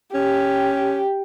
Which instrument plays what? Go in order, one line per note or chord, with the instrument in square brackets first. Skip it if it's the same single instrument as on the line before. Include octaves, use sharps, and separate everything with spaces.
[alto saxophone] C#4 [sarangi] G4